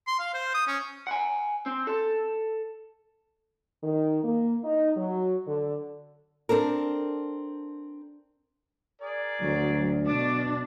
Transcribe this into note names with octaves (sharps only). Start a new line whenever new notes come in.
C6
F5
C5
D#6
C#4
F#5 G#5
C4
A4
D#3
A#3
D#4
F#3
D3
C4 D4 A4 A#4
G#4 A#4 D5
D2 F#3
B2 D4 D6